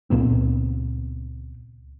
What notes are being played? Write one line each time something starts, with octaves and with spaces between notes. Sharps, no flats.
C#2 A#2 B3 C4